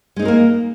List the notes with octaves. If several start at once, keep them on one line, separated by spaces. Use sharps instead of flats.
G#3 A#3 C4 D#4 A#4